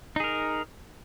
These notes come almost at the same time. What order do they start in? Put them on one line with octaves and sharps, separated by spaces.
D#4 G#4 A#4